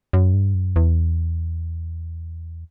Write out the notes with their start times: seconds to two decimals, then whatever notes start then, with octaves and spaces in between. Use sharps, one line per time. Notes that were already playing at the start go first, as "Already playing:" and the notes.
0.13 F#2
0.34 G2
0.54 F#2
0.76 E2